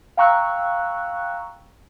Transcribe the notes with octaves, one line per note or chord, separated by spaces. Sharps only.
F5 G5 A#5 C#6 E6 F#6